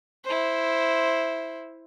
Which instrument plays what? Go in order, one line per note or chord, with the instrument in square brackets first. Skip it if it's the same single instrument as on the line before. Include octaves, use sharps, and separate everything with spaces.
[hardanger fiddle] E4 C5